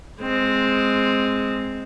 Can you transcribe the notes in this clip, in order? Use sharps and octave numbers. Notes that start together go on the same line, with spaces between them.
G#3 C4